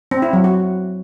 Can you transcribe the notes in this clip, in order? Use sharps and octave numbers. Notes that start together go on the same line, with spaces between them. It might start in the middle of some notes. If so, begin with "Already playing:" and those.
C4
E4
F#3
F#4